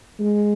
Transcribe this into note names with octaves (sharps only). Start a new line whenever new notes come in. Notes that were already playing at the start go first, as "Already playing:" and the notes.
G#3